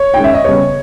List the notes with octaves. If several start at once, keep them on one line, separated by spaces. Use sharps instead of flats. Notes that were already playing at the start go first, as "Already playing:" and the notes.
Already playing: C#5
D#3 G#3 C#4 G5
E5
D#5
C#3 G3 B3 C#5